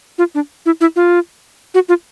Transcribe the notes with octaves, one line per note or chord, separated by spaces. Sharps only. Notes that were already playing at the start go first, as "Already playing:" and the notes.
F4
D4
E4
E4
F4
F#4
F4